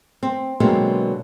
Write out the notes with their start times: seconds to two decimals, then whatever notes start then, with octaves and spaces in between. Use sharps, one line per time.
0.23 C4
0.60 B2 D3 F#3 G#3 A#3 C4